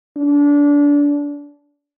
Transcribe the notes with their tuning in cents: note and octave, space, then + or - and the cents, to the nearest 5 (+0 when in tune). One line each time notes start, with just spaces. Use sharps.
D4 -25